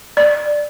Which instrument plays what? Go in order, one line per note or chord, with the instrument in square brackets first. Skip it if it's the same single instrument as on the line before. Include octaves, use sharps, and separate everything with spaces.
[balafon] D5